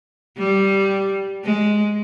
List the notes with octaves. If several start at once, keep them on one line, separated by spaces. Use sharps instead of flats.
G3
G#3